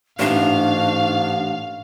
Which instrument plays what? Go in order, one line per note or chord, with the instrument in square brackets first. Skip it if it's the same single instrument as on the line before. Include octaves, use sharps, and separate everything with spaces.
[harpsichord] A1 [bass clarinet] G#2 [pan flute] D4 [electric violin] F5